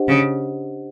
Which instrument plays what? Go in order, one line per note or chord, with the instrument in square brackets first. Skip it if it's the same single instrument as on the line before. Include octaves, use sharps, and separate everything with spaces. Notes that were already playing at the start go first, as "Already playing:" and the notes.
Already playing: [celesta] D4 G4 C5 D#5 F#5
[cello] C#3